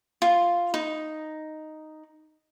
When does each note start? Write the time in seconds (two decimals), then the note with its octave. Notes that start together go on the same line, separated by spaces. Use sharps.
0.22 F4
0.74 D#4